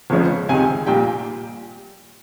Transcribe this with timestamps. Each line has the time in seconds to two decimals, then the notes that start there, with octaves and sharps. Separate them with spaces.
0.10 G1 F2 C#3 F3 G#3 C#5
0.49 C#2 C3 D#3 G#5
0.86 A#1 A#2 G3 G5